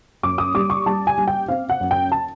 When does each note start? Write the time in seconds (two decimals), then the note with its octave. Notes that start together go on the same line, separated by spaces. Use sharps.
0.23 F#2 D6
0.38 D#6
0.55 G3 D6
0.70 C#6
0.86 G3 A5
1.07 G#5
1.18 G3
1.27 G5
1.48 C4 F5
1.70 F#5
1.81 F#2
1.91 G5
2.12 A5